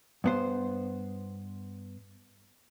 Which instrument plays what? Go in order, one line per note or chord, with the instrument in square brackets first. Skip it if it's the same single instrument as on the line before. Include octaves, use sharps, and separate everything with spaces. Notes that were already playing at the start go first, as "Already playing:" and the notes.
[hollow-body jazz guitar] G2 B3 C5